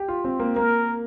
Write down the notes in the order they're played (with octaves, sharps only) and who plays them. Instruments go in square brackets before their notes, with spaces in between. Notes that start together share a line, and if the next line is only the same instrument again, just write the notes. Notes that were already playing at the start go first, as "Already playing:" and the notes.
Already playing: [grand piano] G4
F4
C4
A#3
[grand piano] A#3 [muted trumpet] A#4